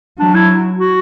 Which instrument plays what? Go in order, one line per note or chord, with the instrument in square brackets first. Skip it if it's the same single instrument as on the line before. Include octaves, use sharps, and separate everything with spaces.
[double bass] F#3 [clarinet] D4
[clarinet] E4
F#4